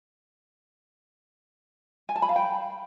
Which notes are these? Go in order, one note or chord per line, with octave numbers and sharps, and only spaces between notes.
G#5
A5
B5
F5
G5